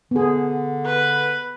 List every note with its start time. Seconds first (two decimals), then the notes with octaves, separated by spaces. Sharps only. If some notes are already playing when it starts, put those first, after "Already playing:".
0.11 D3 B3 G#4
0.86 B4